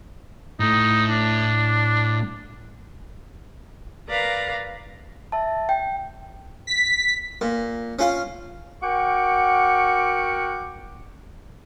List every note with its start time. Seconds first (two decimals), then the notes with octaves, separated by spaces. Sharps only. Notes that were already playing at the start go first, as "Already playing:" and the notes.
0.60 A2 A3 D#4
1.09 D4
4.09 A#4 B4 D5 F5 A#5
5.32 E5 A5
5.69 G5
6.67 B6
7.41 A#2
7.99 C#4 F4 F5
8.82 F#4 A#4 F#5 G5 C#6 D6